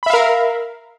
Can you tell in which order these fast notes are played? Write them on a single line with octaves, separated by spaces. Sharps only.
B5 E5 F5 A#4